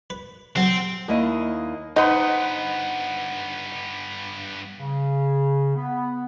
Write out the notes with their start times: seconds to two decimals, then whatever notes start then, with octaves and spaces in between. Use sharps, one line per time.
0.10 B4
0.56 C3 F#3 C4 A4
1.08 D#2 A#3 E4 D#5
1.96 G2 B3 D#4 B4 C5 D#5 F#5
4.79 C#3
5.75 B3